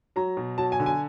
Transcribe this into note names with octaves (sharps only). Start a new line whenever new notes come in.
F#3 A#5
B2
F#3 A5
G#5
D3
G#5